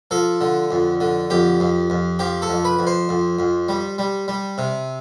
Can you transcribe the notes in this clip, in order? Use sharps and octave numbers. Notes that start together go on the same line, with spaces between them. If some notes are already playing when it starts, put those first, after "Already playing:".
F3 A4
D3
F2
D3
F2 G4
F2
F2
F3 G4
A4
F2
B4
F2
C5
F2
F2
G3
G3
G3
C3